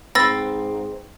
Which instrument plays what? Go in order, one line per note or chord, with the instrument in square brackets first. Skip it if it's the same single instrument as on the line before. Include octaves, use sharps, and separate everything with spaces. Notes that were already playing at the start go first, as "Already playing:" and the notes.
[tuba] G#2 [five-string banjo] C4 B4 [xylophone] E6 A6 A#6